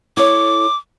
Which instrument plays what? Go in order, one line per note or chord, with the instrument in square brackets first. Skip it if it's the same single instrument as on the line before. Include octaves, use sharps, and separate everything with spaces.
[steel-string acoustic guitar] E4 A4 C#5 [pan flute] D6